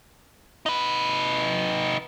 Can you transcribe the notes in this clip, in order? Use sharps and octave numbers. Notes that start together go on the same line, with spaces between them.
D#4 B4